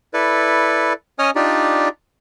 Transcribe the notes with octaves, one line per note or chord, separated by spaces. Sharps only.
E4 A4 B4 D5
C#4 C#5 D#5 G#5 D#6 F6
D4 D#4 F4 G4 D5